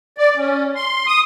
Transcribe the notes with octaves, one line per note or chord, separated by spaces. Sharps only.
D5
C#4
C6
D#6